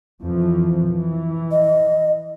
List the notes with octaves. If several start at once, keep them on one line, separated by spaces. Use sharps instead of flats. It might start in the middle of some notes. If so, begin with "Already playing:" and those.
F2 E3 F3
E3
D#5